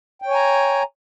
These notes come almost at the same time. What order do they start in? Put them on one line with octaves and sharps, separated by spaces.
G5 C#5 G#5 A#5